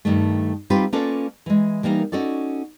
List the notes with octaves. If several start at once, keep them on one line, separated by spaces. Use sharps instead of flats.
G2 D#3 G3 A3
G3 C4 D#4 F4 G4 B4
A#3 C#4 F4 A4 B4 D5
E3 G#3
E3 G3 A#3 D#4 A#4
C#4 D#4 F#4 A4 D5